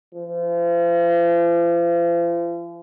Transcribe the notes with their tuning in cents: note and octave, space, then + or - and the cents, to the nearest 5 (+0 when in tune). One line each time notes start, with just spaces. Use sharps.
F3 -40